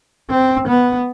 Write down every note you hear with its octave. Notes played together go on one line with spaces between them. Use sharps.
C4
B3